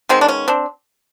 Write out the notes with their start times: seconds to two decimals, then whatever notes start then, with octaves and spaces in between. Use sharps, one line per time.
0.09 D#3 G#3 B3 C4
0.21 D4
0.28 C#4
0.48 C4 D4